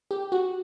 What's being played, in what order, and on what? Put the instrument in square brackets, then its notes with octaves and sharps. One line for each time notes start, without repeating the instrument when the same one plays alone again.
[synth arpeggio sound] G4
F#4